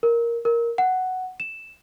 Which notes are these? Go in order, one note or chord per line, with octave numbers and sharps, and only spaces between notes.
A#4
A#4
F#5
E7